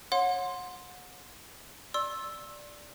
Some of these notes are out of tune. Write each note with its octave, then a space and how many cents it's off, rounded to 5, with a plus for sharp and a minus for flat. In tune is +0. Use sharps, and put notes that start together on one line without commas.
C#5 -15 F#5 -30 C6 +0
D5 +0 C6 +35 E6 +0